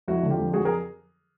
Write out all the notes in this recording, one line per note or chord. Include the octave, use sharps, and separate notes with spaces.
F2 E4 F#4
D3
F4 G4
F2
F#3 F#4 G#4
G#4 A#4